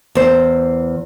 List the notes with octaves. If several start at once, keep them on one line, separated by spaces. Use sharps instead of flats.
E2 C5